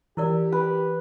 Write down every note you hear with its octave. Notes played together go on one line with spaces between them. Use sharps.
E3 E4 G4 A#4 D5
B4